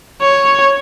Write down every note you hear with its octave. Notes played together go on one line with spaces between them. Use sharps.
C#5